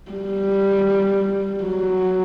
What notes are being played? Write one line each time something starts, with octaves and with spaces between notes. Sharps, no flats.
G3
F#3